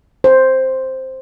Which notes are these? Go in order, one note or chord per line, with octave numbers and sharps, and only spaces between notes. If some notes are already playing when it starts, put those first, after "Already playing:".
C5